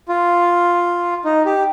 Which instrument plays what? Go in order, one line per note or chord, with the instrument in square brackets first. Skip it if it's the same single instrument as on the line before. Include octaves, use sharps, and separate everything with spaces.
[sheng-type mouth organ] F4
D#4
G4